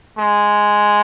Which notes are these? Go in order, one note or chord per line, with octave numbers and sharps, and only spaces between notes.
G#3